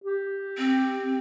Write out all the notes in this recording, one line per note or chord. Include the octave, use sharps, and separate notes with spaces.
G4
C4